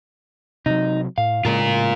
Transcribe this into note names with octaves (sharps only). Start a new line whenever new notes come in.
C3 F#3 D#4
A2 F5
A2 C#3 G#3 F4 A#4